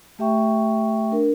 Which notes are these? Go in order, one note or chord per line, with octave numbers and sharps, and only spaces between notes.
A3 G4 E5 G5 C#6
D4 A#4